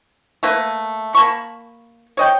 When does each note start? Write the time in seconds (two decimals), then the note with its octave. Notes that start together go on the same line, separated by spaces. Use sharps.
0.43 A3 A#3 B4
1.15 A#3 A5 B5 C#6
2.17 C#5 D#5 G5